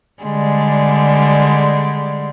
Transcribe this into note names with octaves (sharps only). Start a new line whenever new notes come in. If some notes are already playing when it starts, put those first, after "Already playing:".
D3 G3 G#3